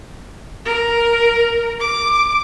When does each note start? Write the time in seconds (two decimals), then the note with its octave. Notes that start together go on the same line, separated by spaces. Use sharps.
0.66 A#4
1.80 D6